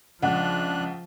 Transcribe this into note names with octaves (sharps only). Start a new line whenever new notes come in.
C#2 F3 D4 F#5 F#6